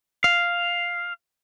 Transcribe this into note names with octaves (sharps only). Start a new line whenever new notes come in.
F5